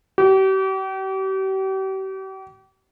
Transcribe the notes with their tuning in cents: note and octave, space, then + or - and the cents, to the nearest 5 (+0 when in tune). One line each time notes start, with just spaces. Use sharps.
G4 -40